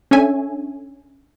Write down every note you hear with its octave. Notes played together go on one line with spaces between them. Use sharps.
C#4 D4 A4 C#5 E5 G#5